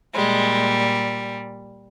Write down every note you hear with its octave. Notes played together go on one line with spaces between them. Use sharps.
A#2 G3 G#3